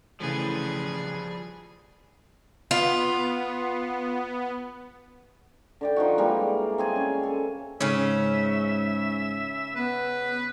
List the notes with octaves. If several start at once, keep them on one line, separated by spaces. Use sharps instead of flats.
C#3 E3 F3 G3 A3 G#4 B4
B3 F4
D3 D5 G5
F3 D#4 F#4
E3 G3 G#3 A#3
C4 G#4 G#5
C#4
A4
G#2 C#3 C#4 E5
B3 B4